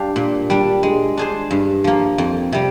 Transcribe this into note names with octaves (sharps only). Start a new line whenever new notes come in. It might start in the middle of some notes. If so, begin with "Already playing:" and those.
Already playing: G3 D4 G4 F5
A#2
G3 D4
G#3
D4 G#4 C5
G2
F3 A#3
F2
C3 G3